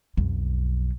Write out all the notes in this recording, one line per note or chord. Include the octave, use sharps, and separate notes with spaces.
B1 F2